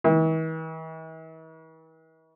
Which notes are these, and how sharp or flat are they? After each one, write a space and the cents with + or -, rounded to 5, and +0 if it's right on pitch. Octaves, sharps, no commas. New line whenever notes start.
E3 -45